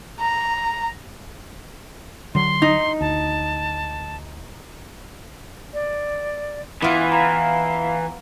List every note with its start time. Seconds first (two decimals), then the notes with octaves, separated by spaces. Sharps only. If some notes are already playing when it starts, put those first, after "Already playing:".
0.20 A#5
2.35 D3 F#3 C6
2.62 D#4
3.01 D2 A5
5.74 D5
6.82 E3 B3 F4 E5
7.12 F5 A#5